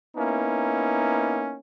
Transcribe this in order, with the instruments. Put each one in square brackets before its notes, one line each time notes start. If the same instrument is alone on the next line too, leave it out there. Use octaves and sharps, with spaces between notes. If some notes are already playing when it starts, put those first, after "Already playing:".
[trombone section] A#3 B3 C#4 D#4 E4